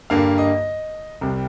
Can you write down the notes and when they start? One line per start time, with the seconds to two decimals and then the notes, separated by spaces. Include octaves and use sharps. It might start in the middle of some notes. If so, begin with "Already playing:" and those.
0.10 G2 D3 G3 A#3 F5
0.38 D#5
1.21 C2 C3 G3